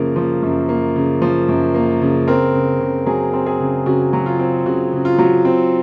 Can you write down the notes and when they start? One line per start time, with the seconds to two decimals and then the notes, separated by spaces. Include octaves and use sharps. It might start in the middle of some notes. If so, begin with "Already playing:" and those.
Already playing: F#2 C#3 F3 A#3 A#4
0.16 F3
0.42 F#2
0.69 A#3
0.96 C#3
1.22 F3
1.48 F#2
1.75 A#3
2.01 C#3
2.28 C4 A#4
2.54 C#3
2.80 C#3
3.06 F#3 G#4
3.33 C4
3.46 G#4
3.60 C#3
3.86 C#3 F#4
4.13 F#3
4.26 F4
4.39 C4
4.66 C#3 F#4
4.92 C#3
5.05 F4
5.19 F#3
5.45 C4